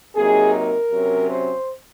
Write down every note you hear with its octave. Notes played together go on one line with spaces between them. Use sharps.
C3 F#3 A#3 D#4 G#4
A#4
C3 F#3 C#4
C5